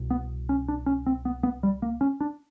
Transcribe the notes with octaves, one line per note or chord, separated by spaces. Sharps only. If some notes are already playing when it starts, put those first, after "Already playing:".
Already playing: C2 B2
B3
C#4
D4
C#4
C4
B3
B3
G3
A#3
C#4
D4